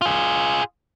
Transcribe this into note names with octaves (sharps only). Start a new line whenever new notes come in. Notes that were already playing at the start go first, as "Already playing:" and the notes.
F4 G#4